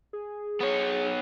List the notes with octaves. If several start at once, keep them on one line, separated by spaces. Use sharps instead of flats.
G#4
B3 C#5